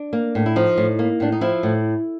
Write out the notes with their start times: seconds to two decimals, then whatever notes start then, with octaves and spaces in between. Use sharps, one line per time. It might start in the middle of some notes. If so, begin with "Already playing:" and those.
Already playing: D4
0.13 A#3
0.35 A2
0.46 E4
0.56 F3 D#4
0.77 A2
0.99 A#3
1.20 A2 D4
1.32 D#4
1.41 F3 E4
1.63 A2